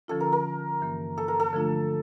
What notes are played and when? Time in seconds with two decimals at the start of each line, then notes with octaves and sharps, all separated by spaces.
0.08 D3 F3 C#4 F4 A4
0.20 A#4
0.32 A#4
0.81 G2 E3 A#3
1.18 A4
1.28 A#4
1.40 A4
1.53 D3 F3 A3 D4 F4